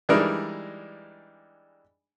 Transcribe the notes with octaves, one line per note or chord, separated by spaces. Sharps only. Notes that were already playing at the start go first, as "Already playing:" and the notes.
E3 G3 G#3 D4 D#4 A#4